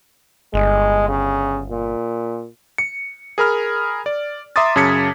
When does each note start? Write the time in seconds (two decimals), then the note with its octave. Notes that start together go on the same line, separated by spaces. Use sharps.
0.54 G1 G#3
1.09 C#3
1.70 A#2
2.78 C#7
3.38 G#4 A#4 B5 F6
4.06 D5
4.56 E5 A#5 C6 D6 D#6 A6
4.76 F#2 C#3 A5 G#6 B6 C#7